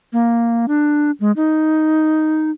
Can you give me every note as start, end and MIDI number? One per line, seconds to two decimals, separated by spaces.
0.13 0.66 58
0.68 1.11 62
1.20 1.32 56
1.36 2.50 63